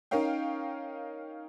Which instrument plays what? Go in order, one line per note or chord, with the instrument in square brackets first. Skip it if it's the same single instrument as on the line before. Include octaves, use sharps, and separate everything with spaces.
[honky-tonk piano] C#4 D#4 A#4 C#5 F5 G5